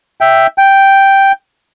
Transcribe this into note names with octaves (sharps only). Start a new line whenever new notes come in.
E5 G5
G5